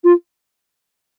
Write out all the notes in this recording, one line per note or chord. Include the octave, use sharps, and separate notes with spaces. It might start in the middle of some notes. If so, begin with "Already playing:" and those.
F4